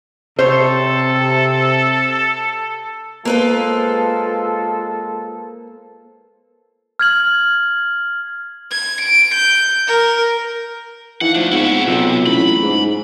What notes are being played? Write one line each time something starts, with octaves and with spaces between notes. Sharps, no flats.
C3 A4 C5 C#5
G#3 A#3 F4 A4 B4 C5
F6 G#6 F#7
G#6
D7
G6
A#4
E3 D#4 F5 F#5
F3 A3 D4
G#2 B3 C4 E4 C#5 F#5
B1 C3 F4 E6
A1 B5
G#2 G#4